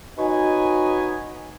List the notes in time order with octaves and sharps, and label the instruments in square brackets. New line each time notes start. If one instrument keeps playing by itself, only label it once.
[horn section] D#4 F#4 B4 C#5 D#5 G#5